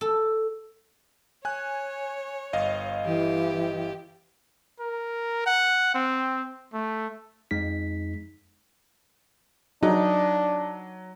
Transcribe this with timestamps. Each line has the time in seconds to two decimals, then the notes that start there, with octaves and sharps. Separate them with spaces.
0.01 A4
1.45 C#5 G#5 F#6
2.53 G1 D#5 F5
3.05 E3 G4
4.80 A#4
5.46 F#5
5.95 C4
6.74 A3
7.51 F2 G#3 D#4 B6
9.83 F#3 D4 D#4